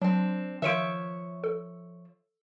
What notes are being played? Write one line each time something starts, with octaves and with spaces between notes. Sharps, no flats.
F#3 C4 D4
D#3 F3 A#4 C#5 E5 D7
A4